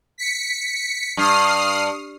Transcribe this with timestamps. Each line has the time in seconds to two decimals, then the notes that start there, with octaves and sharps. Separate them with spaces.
0.18 B6 C#7
1.17 G2 D#6 F6 C7